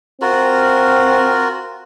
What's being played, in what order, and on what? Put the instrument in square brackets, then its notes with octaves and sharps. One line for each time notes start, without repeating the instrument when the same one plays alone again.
[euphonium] C4 [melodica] F4 F#4 A#4